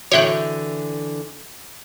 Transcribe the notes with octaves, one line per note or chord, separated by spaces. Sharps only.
D3 E3 F#4 C#5 E5 G5 F#6